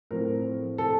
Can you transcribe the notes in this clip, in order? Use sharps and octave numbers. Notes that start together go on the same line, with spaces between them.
A2 F3 C4 A#4
A4